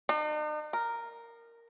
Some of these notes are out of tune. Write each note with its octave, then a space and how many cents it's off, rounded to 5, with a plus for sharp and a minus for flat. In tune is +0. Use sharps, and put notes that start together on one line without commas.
D#4 -45
A#4 -5